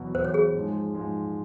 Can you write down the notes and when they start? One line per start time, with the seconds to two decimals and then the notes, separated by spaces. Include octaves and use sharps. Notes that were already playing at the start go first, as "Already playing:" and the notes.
Already playing: E2 B2 F#3
0.15 E2 B2 F#3 C5
0.25 C#5
0.34 G#4
0.54 G#2 F3 G#3
0.95 G#2 F3 G#3